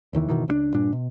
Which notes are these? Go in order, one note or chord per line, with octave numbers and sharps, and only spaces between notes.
F1 D#2 D#3 E3
F#1 B2 D#3 E3
C#2 G3 D4
G2 A#2 D4
B2